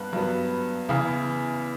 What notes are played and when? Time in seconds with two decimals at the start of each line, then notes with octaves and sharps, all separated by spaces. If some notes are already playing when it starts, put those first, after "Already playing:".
Already playing: G2 B3 F#6
0.13 G2 F#3 B3
0.89 E2 C#3 E3